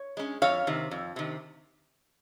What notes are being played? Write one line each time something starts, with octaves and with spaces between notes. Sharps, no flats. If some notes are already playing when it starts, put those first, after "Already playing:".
Already playing: C#5
G#3 C#4
F2 C#5 F5
C3 D#3
F2
C3 D#3